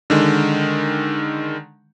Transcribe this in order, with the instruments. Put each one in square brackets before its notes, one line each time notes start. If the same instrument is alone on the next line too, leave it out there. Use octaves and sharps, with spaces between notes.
[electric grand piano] D3 D#3 G#3